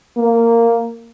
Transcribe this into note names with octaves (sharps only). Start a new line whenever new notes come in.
A#3